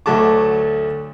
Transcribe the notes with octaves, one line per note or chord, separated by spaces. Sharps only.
D2 F#3 A3 A5 D6